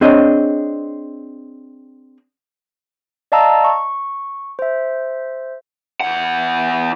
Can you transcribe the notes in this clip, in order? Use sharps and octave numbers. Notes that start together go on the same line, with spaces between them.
C4 D4 G#4 C#5 D#5
D5 D#5 F5 A5 A#5 E6
C#6
C5 E5
E2 F#5